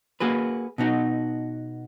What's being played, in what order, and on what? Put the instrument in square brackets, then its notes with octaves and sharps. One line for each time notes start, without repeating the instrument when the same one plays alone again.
[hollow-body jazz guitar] A#3 F#4 G#4 B4
B2 B3 D#4 F#4